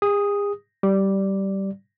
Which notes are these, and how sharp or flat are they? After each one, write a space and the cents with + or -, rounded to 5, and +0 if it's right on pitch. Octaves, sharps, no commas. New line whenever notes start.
G#4 -40 D#6 +0
G3 -15 D5 +0